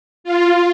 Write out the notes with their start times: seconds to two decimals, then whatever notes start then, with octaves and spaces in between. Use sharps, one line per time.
0.24 F4